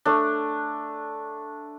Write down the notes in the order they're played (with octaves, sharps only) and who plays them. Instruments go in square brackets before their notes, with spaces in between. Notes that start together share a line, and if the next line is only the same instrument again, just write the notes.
[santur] A3 D4